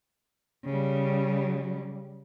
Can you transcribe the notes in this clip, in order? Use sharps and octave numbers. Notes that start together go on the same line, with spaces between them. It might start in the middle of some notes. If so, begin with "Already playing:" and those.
C#3 G3